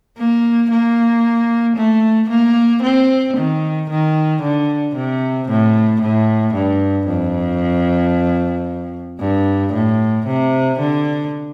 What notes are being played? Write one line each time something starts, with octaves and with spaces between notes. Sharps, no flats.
A#3
A#3
A3
A#3
C4
D#3
D#3
D3
C3
A2
A2
G2
F2
G2
A2
C3
D3